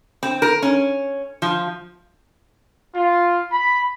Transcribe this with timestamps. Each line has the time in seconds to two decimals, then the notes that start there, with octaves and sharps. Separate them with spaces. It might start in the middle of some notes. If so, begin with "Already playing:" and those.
0.23 C4
0.42 A#4
0.62 C#4
1.42 F3
2.95 F4
3.52 B5